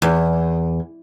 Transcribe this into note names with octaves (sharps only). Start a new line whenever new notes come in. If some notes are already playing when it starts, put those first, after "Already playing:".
E2